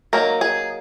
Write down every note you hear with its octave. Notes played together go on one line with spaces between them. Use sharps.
F#3 A#3 D#4 A#4
G#4